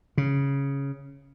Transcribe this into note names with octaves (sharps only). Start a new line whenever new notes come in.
C#3